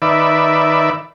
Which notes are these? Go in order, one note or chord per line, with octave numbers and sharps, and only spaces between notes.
D#3 B4 D5 E5